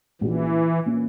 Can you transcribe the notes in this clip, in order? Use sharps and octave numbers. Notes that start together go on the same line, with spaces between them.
A#1 A#2 E3 A#3 C#4 F#4
A#2 A#3 C#4